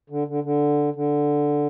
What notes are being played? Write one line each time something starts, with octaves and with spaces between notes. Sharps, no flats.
D3
D3
D3
D3